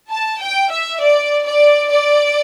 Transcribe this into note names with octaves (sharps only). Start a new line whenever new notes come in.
A5
G5
E5
D5
D5
D5